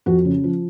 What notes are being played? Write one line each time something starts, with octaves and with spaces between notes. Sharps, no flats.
F2 F#4
C#3
F3